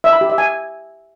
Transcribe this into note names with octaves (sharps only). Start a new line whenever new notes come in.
E5
B5
G4
E5
G#5